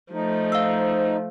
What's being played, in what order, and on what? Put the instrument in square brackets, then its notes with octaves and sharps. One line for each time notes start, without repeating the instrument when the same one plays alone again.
[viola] F3 A3 [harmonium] D#4
[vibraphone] C5 [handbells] F5 E6